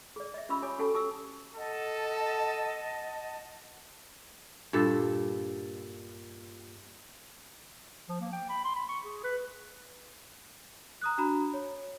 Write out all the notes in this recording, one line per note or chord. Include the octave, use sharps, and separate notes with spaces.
G#4 D5
D#5 E5
C#4 F4 G4 B5 C6 E6
G4 C#5 G#5 D6 D#6
C#4 F#4 G4 A4 G5 A5
G4 A5 D#6 E6
A4 D#5 F#5 A5
G2 A#2 A4
F3
A#3
G5
B5
C6
B5
C#6
G#4
B4
A#5 D#6 F#6
D4 F#4 A#5 B5
C#5